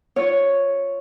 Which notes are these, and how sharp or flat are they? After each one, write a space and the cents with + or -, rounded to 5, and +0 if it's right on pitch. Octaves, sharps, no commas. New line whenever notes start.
F4 +0 C#5 +0